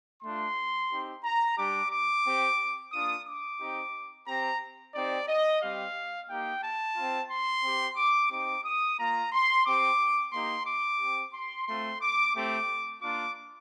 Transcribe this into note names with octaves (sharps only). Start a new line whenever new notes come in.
A3 D4 F4 C6
C4 D#4 G4
A#5
G3 D4 G4 D6
D6
C4 G4
A#3 D4 F4 D#6
D6
C4 D#4 G4
C4 G4 A#5
C4 D#4 G4 D5
D#5
G3 C4 G4 F5
A#3 D#4 G4 G5
A5
C4 F4
C6
C4 G4
D6
C4 D#4 G4 D6
D#6
A#3 F4 A#5
C6
C4 G4 D6
A#3 D#4 G4 C6
D6
C4 G4
C6
A3 C4 F4 C6
D6
A3 C4 G4 D6
A#3 D4 F4 D6